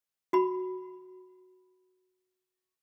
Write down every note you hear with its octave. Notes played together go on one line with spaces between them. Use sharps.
F#4 B5